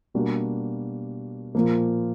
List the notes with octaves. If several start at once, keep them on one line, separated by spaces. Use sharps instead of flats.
B2 G3 A#3 D4 F#4
A#2 F3 A#3